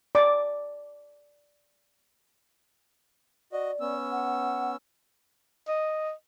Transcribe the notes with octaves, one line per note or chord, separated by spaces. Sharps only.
D5 D6
F#4 D5 D#5
B3 C#4 E6
F#5
D#5